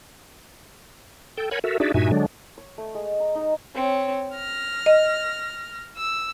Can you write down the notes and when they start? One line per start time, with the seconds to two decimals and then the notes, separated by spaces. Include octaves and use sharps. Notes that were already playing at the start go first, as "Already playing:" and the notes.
1.37 A4 G5
1.51 A#4 C#5 F#5 G#5 B5
1.64 F#4 A4 A#4 E5
1.80 D4 D#4 F#4 G#4 D5 E5
1.94 G2 A#2 D#4 F#4 E5 G#5
2.12 D3 F#3 G#3 D4
2.58 C#5
2.78 A3
2.95 G#3
3.20 A#5
3.35 D#4
3.75 C4 C#5
4.35 F6 A#6
4.86 D#5
5.97 E6